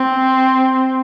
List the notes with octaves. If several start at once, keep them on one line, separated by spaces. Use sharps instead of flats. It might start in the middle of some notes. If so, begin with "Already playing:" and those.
Already playing: C4